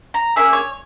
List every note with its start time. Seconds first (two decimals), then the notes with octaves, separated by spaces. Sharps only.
0.14 A#5
0.36 A#3 C#4 G#4 E5
0.53 C#5